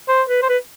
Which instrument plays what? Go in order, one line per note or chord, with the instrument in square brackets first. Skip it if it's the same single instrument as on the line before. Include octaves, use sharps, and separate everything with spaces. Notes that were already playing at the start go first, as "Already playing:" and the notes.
[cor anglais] C5
B4
C5
B4